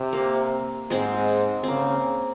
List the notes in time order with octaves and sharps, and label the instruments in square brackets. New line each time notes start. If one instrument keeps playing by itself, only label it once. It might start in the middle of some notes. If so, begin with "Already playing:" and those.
Already playing: [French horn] C3
[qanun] A#3
[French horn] G#2 [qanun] G#3 C4
[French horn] C#3 [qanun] A#3 C4